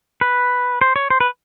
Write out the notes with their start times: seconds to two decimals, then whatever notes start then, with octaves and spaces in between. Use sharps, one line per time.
0.21 B4
0.81 C5
0.96 C#5
1.10 C5
1.20 B4